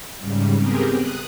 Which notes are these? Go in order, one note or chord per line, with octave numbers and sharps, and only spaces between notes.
G#2 C#3 G3
B3 C4 G4 G#4 A#4
D#6 F#6